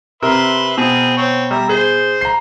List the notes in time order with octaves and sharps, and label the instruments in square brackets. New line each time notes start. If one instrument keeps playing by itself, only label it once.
[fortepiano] C3 [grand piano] A#4 [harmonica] B4 E5 C6
[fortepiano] B2 [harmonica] C4 G#4
[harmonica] C4 C#5
[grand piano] G3 [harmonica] E5 A#5
[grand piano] G#4 [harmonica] C5
[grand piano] A#5 C7